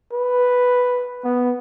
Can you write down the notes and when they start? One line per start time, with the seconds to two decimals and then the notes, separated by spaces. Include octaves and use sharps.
0.13 B4
1.24 B3